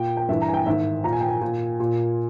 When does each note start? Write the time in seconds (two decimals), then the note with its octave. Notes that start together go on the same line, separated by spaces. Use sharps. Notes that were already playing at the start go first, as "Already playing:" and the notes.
Already playing: A#2 G5
0.17 G5
0.29 G2 E3 E5
0.42 A#5
0.48 G#5
0.54 G5
0.66 G#2 D#3 E5
1.04 A#2 A#5
1.13 G#5
1.21 G5
1.29 G#5
1.41 A#2
1.80 A#2